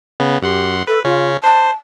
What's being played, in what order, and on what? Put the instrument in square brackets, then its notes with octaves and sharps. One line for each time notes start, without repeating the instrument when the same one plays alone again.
[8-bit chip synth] C#3 B3
[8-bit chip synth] F#2 F#5 C6 [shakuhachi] G4
[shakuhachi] A4 [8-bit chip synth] B4
[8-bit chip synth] C#3 C#4 [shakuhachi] F4
[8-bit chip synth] C5 [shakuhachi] A5